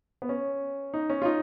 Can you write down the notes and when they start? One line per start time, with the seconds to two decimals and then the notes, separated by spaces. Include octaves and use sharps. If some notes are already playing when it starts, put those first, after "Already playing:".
0.22 B3
0.29 C#4
0.94 D#4
1.10 C#4
1.22 F4
1.25 D#4